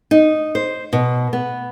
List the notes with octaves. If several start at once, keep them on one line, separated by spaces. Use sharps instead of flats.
D#4
C5
B2
B3